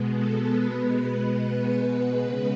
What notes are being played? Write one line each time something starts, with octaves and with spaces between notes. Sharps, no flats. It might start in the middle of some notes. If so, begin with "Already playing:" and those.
Already playing: B2 G#3 B3
A4
B4
B4
C#3 G#3 B3